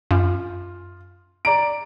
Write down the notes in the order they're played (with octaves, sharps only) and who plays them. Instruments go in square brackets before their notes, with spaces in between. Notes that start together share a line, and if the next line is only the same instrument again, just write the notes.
[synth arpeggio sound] F#2 [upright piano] F4
[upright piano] D5 A#5 D7